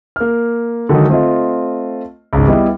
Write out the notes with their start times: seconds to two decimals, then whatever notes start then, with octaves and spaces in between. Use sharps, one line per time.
0.16 A#3 F6
0.89 D3 D#3 F#3 G#3 D#4
1.08 A3 C4 F4 D#5
2.33 G#1 C#2
2.47 G3 B3 E4 D#5 E5